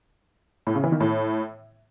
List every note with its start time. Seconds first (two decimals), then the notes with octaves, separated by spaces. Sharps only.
0.67 A2
0.75 C#3
0.84 E3
0.92 D#3
1.00 A2